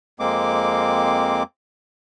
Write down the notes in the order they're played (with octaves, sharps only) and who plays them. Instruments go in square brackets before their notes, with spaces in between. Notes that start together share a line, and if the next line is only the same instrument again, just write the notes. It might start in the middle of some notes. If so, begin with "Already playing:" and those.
[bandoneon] F2 G#3 A#3 C4 D6